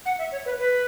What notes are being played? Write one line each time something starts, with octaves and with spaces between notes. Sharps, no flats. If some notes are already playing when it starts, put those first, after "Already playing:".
F#5
E5
C#5
B4
B4